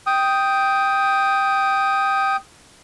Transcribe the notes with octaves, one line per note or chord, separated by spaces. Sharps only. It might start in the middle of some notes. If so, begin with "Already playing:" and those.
G5 D#6